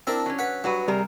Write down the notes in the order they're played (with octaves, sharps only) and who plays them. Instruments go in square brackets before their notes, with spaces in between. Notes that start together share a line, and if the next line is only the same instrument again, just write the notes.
[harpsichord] C4 E4 A#4 [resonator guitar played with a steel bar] D4
[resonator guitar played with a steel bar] F#3 C#4
[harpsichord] B4 F#5
[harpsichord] G2 [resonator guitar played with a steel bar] F#3 F#4 B4
[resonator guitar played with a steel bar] C3 G#4 A#4 [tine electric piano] G3